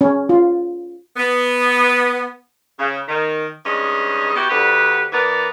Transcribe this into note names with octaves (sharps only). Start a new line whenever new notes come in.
C#4
F4
B3
C#3
D#3
G2 G#3 C#4 D#4 D#5
B3 E4 F#4 G4
D2 D3 G4 B4 F#5
E3 B3 A#4 B4 D5